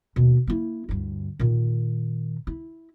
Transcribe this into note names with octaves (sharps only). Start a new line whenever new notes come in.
D#2 B2
A#3 E4
D2 G2
A#2 D#3
E4